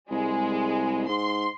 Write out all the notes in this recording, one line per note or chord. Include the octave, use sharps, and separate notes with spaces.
C2 G#3
G#2 C6